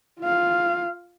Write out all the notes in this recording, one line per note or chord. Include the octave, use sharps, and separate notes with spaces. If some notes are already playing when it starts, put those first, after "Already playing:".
F4 F5